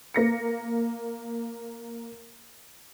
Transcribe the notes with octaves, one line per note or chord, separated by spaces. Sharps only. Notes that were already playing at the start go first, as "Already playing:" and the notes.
A#3 A#6 C#7